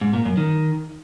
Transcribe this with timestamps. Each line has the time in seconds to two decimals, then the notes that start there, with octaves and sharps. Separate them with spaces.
0.01 G#2
0.13 A#2
0.25 F#2
0.37 D#3